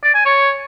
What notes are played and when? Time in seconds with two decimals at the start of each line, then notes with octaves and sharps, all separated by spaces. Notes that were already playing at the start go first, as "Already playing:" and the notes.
0.04 D5
0.15 G#5
0.26 C#5